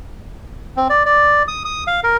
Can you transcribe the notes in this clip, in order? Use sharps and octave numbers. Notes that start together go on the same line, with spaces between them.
C4
D5
D5
D#6
D#6
F5
A#4